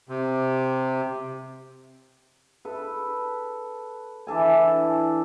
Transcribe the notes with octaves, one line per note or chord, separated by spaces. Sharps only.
C3
A4 B4
E3 D4 A4 G#5